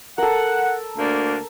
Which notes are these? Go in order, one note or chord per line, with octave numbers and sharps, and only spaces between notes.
A4 A#4 F#5
D2 A#3 D4